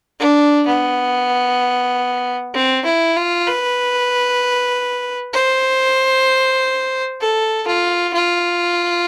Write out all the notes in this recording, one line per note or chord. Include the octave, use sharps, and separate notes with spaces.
D4
B3
C4
E4
F4
B4
C5
A4
F4
F4